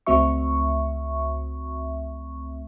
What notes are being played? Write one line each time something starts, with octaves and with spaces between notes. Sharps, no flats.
C#2 A3 C4 F#4 E5 C#6